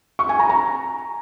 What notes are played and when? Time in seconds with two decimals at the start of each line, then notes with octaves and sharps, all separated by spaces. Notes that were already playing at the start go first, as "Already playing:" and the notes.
0.19 C#6
0.29 G#5
0.39 A#5
0.50 A#5